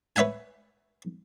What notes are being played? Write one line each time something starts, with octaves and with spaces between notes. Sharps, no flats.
B4 C#5 E5 F#5 G#5